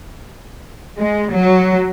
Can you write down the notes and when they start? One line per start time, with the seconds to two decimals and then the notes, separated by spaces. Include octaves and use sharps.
0.97 G#3
1.32 F#3